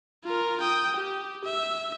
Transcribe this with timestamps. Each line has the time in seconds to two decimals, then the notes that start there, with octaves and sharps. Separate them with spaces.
0.24 F4 A#4
0.60 G5 D#6
0.96 G4
1.44 E5